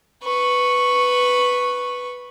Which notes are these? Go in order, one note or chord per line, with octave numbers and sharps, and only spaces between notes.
B4 C#6